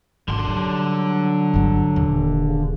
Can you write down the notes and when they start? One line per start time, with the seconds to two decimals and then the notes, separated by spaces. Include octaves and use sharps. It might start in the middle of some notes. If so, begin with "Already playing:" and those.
0.28 G#1 D3 C6
0.48 F#3 G3
1.54 G1 G2
1.96 D#1
2.47 C#3